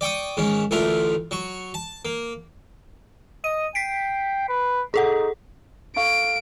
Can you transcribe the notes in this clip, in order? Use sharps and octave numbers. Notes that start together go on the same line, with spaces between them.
D5 G5 C#6 D#6
G#2 D#3 C#4
A1 D2 A2 A3 F4 A#4
F#3 C#6
A5
A#3
D#5 D#7
G5 B6 C7 D7
B4
D#4 G#4 A4 F#5
A4 F5 C#6 D7